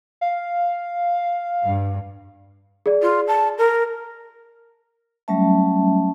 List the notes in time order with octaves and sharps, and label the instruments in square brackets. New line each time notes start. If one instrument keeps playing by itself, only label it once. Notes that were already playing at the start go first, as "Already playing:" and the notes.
[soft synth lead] F5
[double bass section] G2
[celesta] G#4 D5
[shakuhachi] F4
A5
A#4
[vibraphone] F#3 G3 A3 C#4 E5 A5